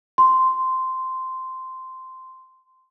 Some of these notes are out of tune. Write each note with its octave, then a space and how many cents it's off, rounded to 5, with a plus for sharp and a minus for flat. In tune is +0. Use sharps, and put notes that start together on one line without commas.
C6 -10